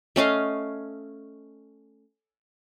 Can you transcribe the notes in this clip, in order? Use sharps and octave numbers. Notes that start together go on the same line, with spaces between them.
A3 C#4 D#5 F5